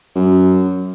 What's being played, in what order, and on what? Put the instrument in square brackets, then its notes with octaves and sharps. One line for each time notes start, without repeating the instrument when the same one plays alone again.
[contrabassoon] F#2